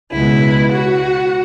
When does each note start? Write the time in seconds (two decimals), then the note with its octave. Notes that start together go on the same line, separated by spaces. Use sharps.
0.12 C#2 B2 G#3 B3 E4
0.71 F#4